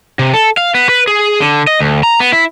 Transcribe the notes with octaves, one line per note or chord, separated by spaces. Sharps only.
C3
A4
F5
B3
B4
G#4
D3
D#5
D2
A#5
B3
E4